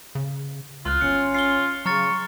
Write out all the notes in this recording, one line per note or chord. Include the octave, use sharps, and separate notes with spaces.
C#3
C#2 F4 C6 F6 F#6
G1 C#4 C#7
F4 C7 G7
C#3 F#3 A#5 C#6 F6 A6